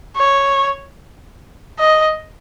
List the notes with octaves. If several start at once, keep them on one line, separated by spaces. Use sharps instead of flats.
C#5
D#5